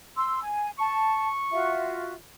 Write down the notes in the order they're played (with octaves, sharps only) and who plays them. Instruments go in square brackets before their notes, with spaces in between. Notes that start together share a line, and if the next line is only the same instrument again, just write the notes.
[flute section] C6 E6
G#5
[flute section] A5 [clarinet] C#6
[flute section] F4 F#4 E5